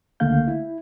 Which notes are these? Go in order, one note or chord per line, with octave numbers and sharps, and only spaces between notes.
C#2 D3 A3 A#3 F5 G6
E4